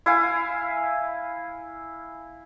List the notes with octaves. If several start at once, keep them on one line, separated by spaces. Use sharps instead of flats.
E4 F5 G#5